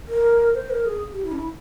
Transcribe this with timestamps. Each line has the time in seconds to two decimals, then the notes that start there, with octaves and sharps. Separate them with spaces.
0.08 A#4
0.54 C5
0.70 A#4
0.86 G#4
1.12 G4
1.24 E4
1.32 C#4
1.36 E4